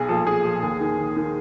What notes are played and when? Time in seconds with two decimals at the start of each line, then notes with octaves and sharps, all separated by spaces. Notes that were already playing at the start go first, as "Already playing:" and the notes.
Already playing: B1 G#4
0.08 A#2 F3 A4
0.27 B1 G#4
0.45 A#2 F3
0.63 D#2
0.81 D#3
0.98 D#2
1.17 D#3